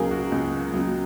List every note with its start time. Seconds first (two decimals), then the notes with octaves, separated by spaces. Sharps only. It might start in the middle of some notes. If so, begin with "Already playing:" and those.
Already playing: C#2 C#3 F#3 A#3 G#4 A#4
0.11 F#4
0.32 C#2
0.73 C#3 F#3 A#3